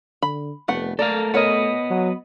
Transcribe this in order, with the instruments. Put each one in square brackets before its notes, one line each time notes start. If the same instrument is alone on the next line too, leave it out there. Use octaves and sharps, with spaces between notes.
[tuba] D3 [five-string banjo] B5
[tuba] F1 [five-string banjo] A3 B3 F#5
[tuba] A3 [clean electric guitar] A4 A#4 F5 [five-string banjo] D5
[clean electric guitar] B3 D#5 [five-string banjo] A#4 C#5 F#5
[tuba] F#3